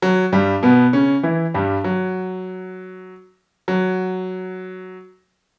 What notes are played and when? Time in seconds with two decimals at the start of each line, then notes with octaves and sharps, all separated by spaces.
0.02 F#3
0.32 G2 G3
0.63 B2 B3
0.93 C#3 C#4
1.23 E3 E4
1.54 G2 G3
1.84 F#3
3.68 F#3